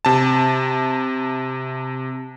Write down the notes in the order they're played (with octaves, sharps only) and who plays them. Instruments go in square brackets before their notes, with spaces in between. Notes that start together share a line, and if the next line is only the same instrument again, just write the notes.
[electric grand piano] C3 A5